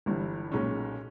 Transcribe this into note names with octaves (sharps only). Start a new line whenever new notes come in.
G1 G2 E3
B1 A#2 G#3 C#4